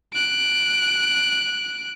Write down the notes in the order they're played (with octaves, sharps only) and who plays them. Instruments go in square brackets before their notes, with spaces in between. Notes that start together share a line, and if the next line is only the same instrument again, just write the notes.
[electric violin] F#6 D7